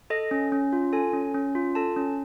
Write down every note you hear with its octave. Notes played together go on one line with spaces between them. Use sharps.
A4 D#5
C#4
C#4
F4
A4 G#5
C#4
C#4
F4
A4 A5
C#4